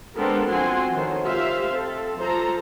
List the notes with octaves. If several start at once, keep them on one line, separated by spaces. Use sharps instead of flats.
G#3 B3 C4 D4 A4 A#4
F3 C4 F#4 F#5 G#5 C6
D#3 A4 C5 C#5
F4 G4 C5 E5 F5
C4 A4
F3 A4 C5 A#5